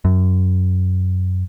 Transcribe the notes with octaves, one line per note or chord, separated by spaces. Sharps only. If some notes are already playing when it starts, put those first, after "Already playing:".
F#2